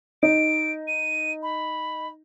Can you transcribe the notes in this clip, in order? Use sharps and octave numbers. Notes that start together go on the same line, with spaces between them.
D#4 D7
D#7
B5